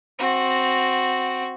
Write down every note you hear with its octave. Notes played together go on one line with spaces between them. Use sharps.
C4 F#4